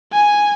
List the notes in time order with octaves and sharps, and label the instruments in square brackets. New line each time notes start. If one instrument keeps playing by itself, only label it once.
[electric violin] G#5